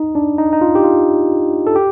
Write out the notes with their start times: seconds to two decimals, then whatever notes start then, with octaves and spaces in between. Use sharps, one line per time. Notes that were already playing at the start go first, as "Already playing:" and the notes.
Already playing: D#4
0.15 D4
0.38 D#4
0.53 D#4
0.61 F4
0.75 G4
0.84 F4
1.67 A4
1.76 G4